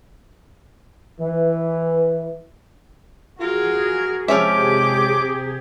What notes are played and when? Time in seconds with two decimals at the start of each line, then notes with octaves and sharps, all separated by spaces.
1.21 E3
3.40 F4 F#4 G#4 A#4
4.28 C3 F3 G#3 C#4 G4 G#4 E5 D6